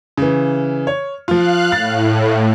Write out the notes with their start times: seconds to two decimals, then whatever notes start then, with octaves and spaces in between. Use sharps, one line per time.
0.17 C#3 E3
0.87 C#5
1.28 F3 F4 F5 F#6
1.72 A2 A6